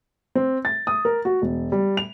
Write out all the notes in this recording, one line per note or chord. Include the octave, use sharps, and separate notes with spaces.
C4
A6
D#6
A#4
F#4
E1
G3
F7